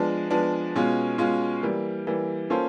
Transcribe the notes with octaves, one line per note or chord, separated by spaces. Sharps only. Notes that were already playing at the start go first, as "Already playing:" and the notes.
Already playing: F3 G#3 B3 D4
F3 G#3 B3 D4
B2 G#3 C#4 F4
B2 G#3 C#4 F4
E3 G3 A#3
E3 G3 A#3
A#3 C#4 F4 A4 C5